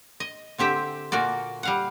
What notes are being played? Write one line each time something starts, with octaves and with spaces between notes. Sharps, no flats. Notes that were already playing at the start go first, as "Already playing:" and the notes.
D#5
D3 C4 G4 E5 G5
A#2 A#3 F#4 D5
G3 F5 F#5